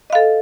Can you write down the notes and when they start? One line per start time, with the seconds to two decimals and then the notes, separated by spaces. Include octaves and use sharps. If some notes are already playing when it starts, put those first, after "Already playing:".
0.10 D#5
0.13 F5
0.15 A4